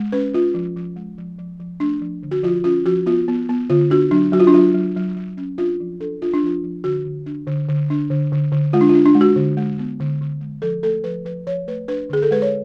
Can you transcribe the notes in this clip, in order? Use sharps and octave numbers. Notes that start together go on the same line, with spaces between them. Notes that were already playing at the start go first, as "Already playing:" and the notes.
Already playing: G#3
C#4 B4
C#4 F4
F3
F3
G#3
F3
F3
F3
A3 D4
F3
D3
F#4
F3 F4
C#4 F4
F3 F#4
B3 F4
B3
B3
D3 F4
D4 F#4
F#3 D4
F#3 F#4
F4
D4
F#3 F4
F#3
F#3
F#3
C#4
D4 F4
F3
D4 A4
D4 F4
D4
F3 F4
F3
D3 F#4
D3
D4
D3
D3
D4
D3
D3
D3
G#3 F4
D4
F4
D4
D4
G#3
F#4
D3
G#3
B3
D3
D3
G#3
F3 A4
A3 A4
F3 B4
F3 B4
F3 C#5
A3 B4
D4 B4
D3 G#4
A4
G#3 B4
C#5